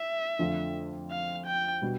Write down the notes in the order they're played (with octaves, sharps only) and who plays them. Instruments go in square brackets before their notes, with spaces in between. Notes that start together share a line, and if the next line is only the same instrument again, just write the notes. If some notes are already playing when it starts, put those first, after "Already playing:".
Already playing: [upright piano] E4 [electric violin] E5
[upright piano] F2 D3 A3 D4 F4
[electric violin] F5
G5
[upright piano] B2 G3 D4